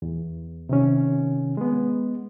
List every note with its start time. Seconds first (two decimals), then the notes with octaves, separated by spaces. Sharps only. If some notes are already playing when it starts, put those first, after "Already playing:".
0.02 E2
0.69 C3 D#3 C#4
1.57 G#3 B3